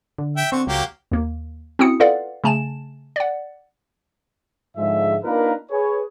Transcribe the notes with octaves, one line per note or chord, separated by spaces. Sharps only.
D3
E5 G5
D3 C4 C#6
C#2 F#3 A#3 G4
D#2 A#3
C4 C#4 E4 F#4 D#6 C#7
F4 A4 B4 D5 F5 F#5
C#3 A3 G#5 A5 E7
D5 F#5
G#2 D3 F3 G#3 E5
A#3 D4 D#4 F4 A#4 B4
G#4 B4 C#5